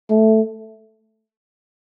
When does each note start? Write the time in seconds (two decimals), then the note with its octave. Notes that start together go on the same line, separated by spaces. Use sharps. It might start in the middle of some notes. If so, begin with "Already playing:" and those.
0.11 A3